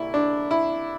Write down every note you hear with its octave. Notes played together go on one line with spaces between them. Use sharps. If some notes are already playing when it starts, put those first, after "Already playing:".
Already playing: C2 A#2 G3 E4
D4
E4